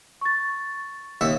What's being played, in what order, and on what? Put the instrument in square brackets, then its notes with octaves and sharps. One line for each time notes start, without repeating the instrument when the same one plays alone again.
[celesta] C#6 A6
[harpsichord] D#2 E5 C#6